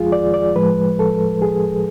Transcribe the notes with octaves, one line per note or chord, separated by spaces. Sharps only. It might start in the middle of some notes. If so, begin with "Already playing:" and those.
Already playing: F2 F3 G#3 F4 G#4
D5
D5
A2 F3 G#3 B4
A4
G#4